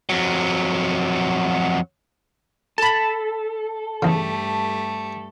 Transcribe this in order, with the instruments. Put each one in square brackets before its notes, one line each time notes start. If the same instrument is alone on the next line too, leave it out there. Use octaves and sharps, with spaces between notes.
[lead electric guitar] F2 F#3
[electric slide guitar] A4 [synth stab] A5 B5
[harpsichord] E2 C#3 [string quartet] G2 A3 G4